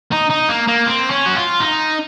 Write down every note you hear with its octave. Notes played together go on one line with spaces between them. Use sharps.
D#4
D#4
A#3
A#3
C4
C#4
F#4
F4
D#4